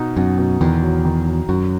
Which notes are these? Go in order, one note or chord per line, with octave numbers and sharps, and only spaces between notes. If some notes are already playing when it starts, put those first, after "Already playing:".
Already playing: B2 D#4
F#2 B2
B2
E2 D#3
F#3
D#3
F#3
F#2 F#4